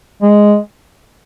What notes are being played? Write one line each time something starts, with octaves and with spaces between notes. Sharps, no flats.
G#3